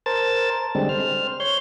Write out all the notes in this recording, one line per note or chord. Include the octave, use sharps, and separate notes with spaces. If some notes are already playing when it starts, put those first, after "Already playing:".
A#4 C5 A5 A6
D3 G3 G#3 C4
C5 F6
C#5 C6 G6